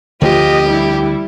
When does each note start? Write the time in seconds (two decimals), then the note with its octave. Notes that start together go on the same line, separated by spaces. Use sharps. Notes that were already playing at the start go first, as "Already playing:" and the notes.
0.21 D2 D3 F3 F4 G4 D#5
0.67 G3 E4